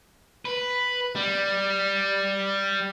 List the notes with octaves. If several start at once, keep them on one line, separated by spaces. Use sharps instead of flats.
B4
G3